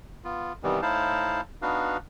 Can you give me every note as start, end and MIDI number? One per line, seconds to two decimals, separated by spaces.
0.24 0.53 59
0.24 0.53 65
0.63 0.81 48
0.63 0.81 51
0.63 0.81 52
0.63 0.81 55
0.63 0.81 59
0.82 1.41 45
0.82 1.41 63
0.82 1.41 64
0.82 1.41 72
0.82 1.41 77
0.82 1.41 81
1.62 1.97 59
1.62 1.97 62
1.62 1.97 63
1.62 1.97 66
1.62 1.97 71
1.62 1.97 77